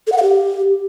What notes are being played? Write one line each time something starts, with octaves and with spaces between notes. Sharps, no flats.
A4
F#5
F5
G4